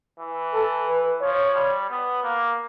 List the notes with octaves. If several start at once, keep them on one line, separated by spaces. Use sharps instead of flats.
E3
A4
B4
F3 C#5
G3
B3
A#3